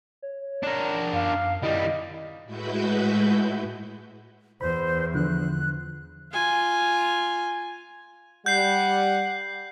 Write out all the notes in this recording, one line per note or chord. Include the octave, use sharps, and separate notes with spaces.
C#5
D4 A#4
F#2 F5
D#3 G3 E4 D#5
A2 G#3 E4 F#4 B4 G6
E2 C5 B5
D3 F3 F#6
F4 G#5
G3 F#5 G6 C7